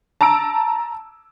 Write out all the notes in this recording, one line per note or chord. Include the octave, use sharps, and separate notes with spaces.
A5 A#5 E6 D7